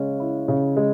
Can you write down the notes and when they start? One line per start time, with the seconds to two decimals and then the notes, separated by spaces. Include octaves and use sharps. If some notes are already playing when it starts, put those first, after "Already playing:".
Already playing: C#3 G#3 C#4
0.20 E4
0.48 C#3
0.77 G#3